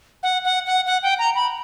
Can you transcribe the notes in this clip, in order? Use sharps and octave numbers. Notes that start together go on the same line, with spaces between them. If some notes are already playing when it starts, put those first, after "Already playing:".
F#5
F#5
F#5
F#5
G5
A#5
B5